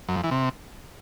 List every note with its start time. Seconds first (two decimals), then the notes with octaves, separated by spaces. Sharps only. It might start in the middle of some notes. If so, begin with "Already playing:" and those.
0.09 F#2
0.16 F2
0.24 E3
0.31 C3